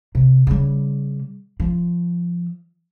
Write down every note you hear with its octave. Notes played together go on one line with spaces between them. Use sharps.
C3
C#3 G3
F3